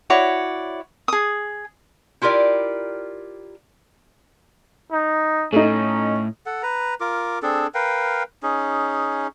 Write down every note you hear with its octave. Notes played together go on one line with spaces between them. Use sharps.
E4 F#4 C#5 D5
G#4 D#6
E4 F4 G4 A#4 D5
D#4
A2 A3 C#4 D#4
A4 F#5
B4 A#5
F4 A#4 D6
C4 D4 G#4 A4
A#4 B4 F5 G5
C#4 D#4 G#4